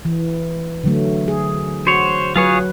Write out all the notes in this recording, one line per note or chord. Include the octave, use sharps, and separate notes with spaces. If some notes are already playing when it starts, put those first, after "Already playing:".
E3
D3 F#3 A3
G#4
F#4 C5 C#5
F#3 F4 G#4 B4 C#5